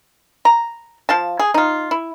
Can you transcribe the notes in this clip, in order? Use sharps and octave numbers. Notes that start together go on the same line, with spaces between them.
A#5
F3 F5 A5
G#4
D#4 F4
E4